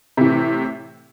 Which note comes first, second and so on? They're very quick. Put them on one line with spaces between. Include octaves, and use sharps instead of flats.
C3 E3 A2